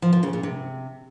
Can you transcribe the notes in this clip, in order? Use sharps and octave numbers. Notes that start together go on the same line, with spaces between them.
F3
F3
C#3
A#2
C3